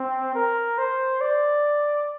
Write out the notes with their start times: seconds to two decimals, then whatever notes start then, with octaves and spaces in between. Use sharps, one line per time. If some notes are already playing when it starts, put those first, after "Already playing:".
Already playing: C4
0.35 A#4
0.78 C5
1.21 D5